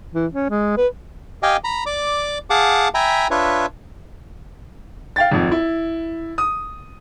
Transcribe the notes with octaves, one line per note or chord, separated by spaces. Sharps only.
E3
C#4
G#3
B4
G4 D#5 F5 G5 G#5
A#5 B5
D5 D6
G#4 F5 F#5 A5 D6
E5 G5 G#5 A#5 B5
D4 F4 B4 C#5 E5
F5 G5 A6
G#1 F2
E4
D#6